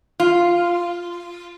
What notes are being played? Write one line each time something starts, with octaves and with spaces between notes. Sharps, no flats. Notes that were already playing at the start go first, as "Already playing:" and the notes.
F4